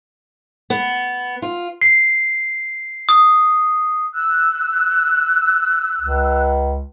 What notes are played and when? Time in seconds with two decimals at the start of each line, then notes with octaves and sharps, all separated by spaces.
0.70 B3
1.42 F4
1.82 C7
3.09 D#6
4.13 E6 F#6
6.00 C#2